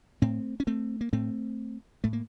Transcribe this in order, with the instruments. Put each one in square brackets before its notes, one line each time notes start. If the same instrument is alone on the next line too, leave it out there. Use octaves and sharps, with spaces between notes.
[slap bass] A2 A3 C4
C#4
A3 C4
A#3
A2 A3 C4
A2 A3
A#3